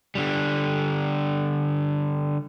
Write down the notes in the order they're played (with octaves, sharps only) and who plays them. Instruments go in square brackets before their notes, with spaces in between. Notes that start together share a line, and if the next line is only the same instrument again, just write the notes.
[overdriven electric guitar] D3 G3